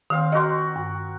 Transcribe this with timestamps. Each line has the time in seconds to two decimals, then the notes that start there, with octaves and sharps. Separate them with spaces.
0.10 D#3 C4 F5 E6
0.32 F#4 A#4 C5 D#5 C6
0.76 G2